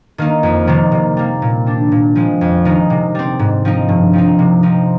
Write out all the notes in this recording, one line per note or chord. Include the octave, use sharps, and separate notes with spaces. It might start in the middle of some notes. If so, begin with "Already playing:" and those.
D#3 A#3 D#4
F2
C3 D#3 G3 A#3
C3
G3 A#3
A#2
G3 D4
A#2
F3 G#3 C4
F2
D#3 G#3 D#4
C3
G3 C4
G#2
F3 C4 D#4
G2
F3 C4 D#4
C3
F3 C4 D#4